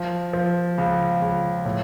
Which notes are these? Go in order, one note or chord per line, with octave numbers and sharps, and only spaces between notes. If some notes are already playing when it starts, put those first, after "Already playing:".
Already playing: F3
F3
C#2
C#2
A2